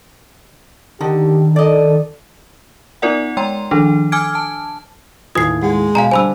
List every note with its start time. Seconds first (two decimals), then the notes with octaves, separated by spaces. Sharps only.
1.01 D3 D#3 G4
1.56 A4 D5 D#5
3.02 B3 D#4 F4 A#4 D5 F#5
3.37 G#3 G5 A#5 C6
3.71 D#3 F3 D4 A4
4.12 G#5 D6 E6 F6 G#6 D7
4.35 A5
5.35 D#2 A2 F4 B4 G#5 D#6 G#6 C7
5.63 G#3 F#5
5.95 B2 F5 G#5 A#5
6.11 D3 G3 F4 C5 G#5 A5 B5 E6